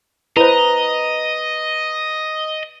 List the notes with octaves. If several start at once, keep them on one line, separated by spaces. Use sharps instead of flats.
E4 B4 C5 D#5 A#5